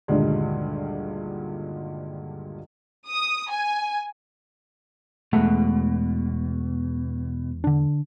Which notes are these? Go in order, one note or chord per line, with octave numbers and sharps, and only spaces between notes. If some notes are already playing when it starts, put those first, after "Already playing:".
D2 G2 A#2 D#3 G3 G#3
D#6
G#5
E2 B2 G#3 A3 F#5
D3 D4